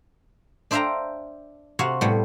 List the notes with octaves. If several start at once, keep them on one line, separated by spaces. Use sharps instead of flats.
D4 C5 E5 F5 G5 A#5
C3 F#4 F5 F#5
A2 G3 B3